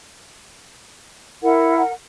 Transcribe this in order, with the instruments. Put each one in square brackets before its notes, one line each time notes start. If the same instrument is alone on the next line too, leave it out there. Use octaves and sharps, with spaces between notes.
[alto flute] E4 [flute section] A#4 F#5